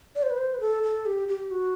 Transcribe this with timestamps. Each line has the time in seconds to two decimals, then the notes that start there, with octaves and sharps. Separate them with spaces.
0.15 D5
0.23 C5
0.30 B4
0.38 C5
0.54 B4
0.60 A4
0.83 A4
1.06 G4
1.28 G4
1.51 F#4